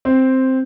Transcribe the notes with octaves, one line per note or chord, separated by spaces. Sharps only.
C4